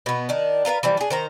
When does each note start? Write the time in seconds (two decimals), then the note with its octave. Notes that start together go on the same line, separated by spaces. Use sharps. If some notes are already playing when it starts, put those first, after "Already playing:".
0.06 B2 B3
0.29 D#3 D4
0.65 F4 A#4 B4 F5
0.83 E3 F3 G3
0.97 D4 G#4
1.10 D#3 C5 A#5